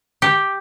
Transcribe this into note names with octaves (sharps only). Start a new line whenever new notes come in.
G4